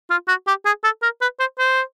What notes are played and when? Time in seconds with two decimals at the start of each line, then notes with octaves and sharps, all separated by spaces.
0.10 F4
0.28 F#4
0.47 G4
0.65 G#4
0.84 A4
1.02 A#4
1.21 B4
1.40 C5
1.59 C5